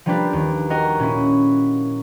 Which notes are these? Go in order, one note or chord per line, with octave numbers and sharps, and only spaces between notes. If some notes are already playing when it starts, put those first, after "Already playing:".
F3 G3 A#3 D4 G4 B4
D#2
F#4 A#4 D#5 G5
A#2 C#4 E4